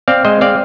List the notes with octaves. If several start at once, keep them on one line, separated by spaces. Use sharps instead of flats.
C4 D5 F5
G#3 C5 D#5
C4 D5 F5